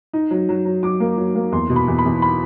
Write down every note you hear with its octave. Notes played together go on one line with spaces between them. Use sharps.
D#4
F#3
F#3
F#3
F#3 D6
A#3
F#3
A#3
E2 C6
B2
B5
E2
B5
E2
B5